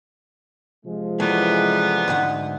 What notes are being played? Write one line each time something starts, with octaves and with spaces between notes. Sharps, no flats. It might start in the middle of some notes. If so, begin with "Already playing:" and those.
C3 F3 G#3
F#2 E3 G3 A3 B3
D2 G#2 F#5